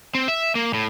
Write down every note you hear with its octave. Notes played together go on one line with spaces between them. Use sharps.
C4
E5
A#3
A2